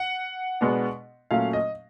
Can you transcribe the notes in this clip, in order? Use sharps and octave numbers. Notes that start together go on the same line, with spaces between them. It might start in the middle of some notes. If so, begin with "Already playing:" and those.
Already playing: F#5
B2 G#3 B3 D4
A#2 F#3 A3 C#4 F5
D#5